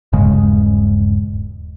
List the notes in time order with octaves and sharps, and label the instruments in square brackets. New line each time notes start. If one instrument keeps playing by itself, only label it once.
[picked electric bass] D#1 G2 C#3 G#3